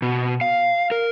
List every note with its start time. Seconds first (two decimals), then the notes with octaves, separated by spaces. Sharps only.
0.02 B2
0.41 F5
0.91 A#4